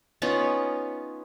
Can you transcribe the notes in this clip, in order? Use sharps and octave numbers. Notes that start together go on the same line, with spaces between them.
B3 C#4 D#4 F4